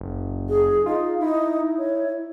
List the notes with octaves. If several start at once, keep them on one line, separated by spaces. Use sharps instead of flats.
F#1
G#4
D#4 F4
D#4 E4
C#5